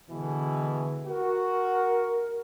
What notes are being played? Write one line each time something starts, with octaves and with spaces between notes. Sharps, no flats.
B2 D3 E3 G#3
F#4 A#4